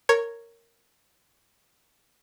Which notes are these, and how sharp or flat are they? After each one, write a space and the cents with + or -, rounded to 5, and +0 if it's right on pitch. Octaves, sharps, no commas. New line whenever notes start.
A#4 -10 C#5 +0